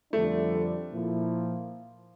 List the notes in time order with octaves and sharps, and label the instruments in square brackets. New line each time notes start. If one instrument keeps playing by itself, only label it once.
[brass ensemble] F2 D3 G3 D4 [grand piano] A3
[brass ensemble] A#2 F3 A#3 E4